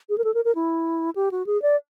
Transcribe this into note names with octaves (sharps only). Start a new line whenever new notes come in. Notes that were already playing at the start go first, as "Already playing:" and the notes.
G#4
A#4
A4
A#4
A#4
E4
G4
F#4
G#4
D5